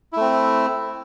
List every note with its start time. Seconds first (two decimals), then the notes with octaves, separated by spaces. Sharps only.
0.13 E4
0.17 A3
0.21 C4